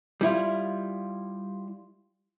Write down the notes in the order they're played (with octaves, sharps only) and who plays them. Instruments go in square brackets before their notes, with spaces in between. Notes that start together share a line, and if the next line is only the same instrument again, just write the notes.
[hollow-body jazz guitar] G3 E4 F4